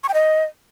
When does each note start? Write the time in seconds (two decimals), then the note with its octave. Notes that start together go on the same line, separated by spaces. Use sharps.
0.03 C#6
0.09 G5
0.14 D#5